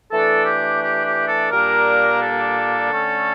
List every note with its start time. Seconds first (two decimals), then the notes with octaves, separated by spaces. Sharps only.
0.11 E3 A3 D4 A4
0.46 G4
0.82 G4
1.05 G4
1.28 A4
1.50 A#2 G3 A#3 D4 A#4
2.20 A4
2.90 D3 A3 C#4